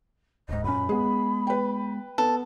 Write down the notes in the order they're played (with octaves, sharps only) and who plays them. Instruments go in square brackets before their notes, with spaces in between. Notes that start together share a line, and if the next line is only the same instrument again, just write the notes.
[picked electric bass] D1 G#2 [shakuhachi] D#5
[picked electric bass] F#2 A#2 C#4 [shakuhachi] B5
[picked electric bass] G#3 B3 [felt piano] G#4
[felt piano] B4 G5
[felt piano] B3 [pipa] A4